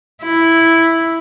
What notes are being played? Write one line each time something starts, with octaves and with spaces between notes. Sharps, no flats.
E4